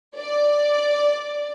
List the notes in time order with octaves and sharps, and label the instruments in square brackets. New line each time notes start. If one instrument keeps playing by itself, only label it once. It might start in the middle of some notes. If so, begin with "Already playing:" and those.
[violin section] D5